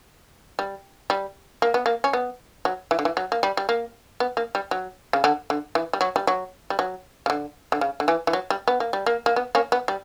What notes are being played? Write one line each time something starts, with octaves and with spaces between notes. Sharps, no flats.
G3
G3
A#3
B3
A#3
C#4
B3
F#3
E3
D3
E3
F#3
A#3
G3
G3
A#3
B3
A#3
G3
F#3
C#3
D3
D3
E3
G3
F#3
G3
F#3
G3
F#3
C#3
D3
D3
C#3
D3
E3
E3
F#3
G3
B3
A#3
G3
A#3
A#3
B3
A#3 C#4
B3
G3